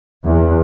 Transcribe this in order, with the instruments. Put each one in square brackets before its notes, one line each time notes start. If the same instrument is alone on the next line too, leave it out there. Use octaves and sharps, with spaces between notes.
[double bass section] E2